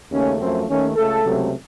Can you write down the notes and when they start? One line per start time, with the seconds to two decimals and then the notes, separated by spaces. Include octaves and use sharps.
0.12 D#2 C#3 A3 C#4
0.40 F#2 F3 A3 C4
0.68 D#2 D#3 A3 C#4
0.96 C#2 C#3 A3 A4
1.23 C#2 C3 F#3 A3